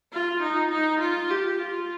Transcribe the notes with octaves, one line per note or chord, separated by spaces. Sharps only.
F4
D#4
D#4
F4
G4
F4